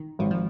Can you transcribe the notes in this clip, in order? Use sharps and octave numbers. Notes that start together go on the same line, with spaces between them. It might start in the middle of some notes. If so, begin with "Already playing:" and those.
Already playing: D#3
G#1 D#3
F3